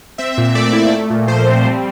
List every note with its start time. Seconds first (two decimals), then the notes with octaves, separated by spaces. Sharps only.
0.18 C4 E5
0.38 A#2
0.55 A3 D5
0.73 E4
0.92 A3
1.10 A#2
1.27 F3 C5
1.46 C4
1.64 G3